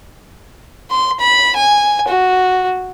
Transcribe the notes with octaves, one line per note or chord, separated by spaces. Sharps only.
C6
B5
G#5
F#4